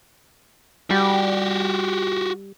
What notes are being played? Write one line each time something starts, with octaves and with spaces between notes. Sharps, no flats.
G3 F#4 G4